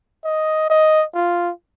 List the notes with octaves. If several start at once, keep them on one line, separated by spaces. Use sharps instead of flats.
D#5
D#5
F4